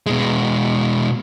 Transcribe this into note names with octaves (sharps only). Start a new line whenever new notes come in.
B2 G#3